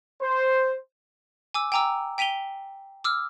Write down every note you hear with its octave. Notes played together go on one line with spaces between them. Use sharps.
C5
G#5 D6 E6
G5 G#5 A#5 D6 E6
G5 B6 D#7 F7 G7
D6 E6 F6